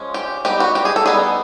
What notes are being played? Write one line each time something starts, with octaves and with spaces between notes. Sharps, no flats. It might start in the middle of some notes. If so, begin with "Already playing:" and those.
Already playing: F3 G#3 C#4
G4
G3 B3 D#4 G4
F#4
G4
G#4
A4
G3 B3 D#4 G#4